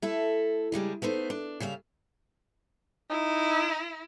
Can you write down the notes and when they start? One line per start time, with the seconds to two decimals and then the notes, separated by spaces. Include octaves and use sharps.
0.02 A3 E4 A4
0.72 C#3 G3 G#3 D4
1.02 A3 B3 D#4 C5
1.30 D4
1.60 C#3 G3 E5 F5
3.10 D#4 E4